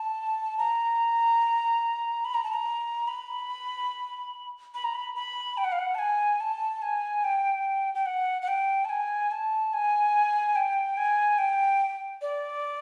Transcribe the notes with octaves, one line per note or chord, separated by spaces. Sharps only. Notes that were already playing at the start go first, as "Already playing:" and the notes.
Already playing: A5
A#5
B5
A#5
A5
A#5
B5
B5
A#5
B5
B5
G5
F#5
F5
F#5
A5
G#5
A5
G#5
G5
G5
F#5
F#5
G5
A5
G#5
A5
G#5
G5
G#5
G5
D5